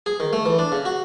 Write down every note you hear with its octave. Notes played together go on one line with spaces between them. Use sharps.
G#4
D#3
A3
E3
D4
C#3
F#4